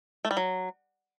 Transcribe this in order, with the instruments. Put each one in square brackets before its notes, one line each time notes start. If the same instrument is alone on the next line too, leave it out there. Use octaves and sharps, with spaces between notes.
[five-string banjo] A3
G3
F#3